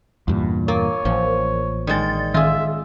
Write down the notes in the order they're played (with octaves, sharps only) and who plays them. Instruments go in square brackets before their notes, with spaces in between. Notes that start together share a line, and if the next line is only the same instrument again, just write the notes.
[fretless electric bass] E2 G2 A#2
[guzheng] A#3 [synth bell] A#4 [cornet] C#5
[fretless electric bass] A1 [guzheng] F3
[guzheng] D#3 G#3 [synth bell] D5 A6
[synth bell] D#3 [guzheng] F4 G#4 [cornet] E5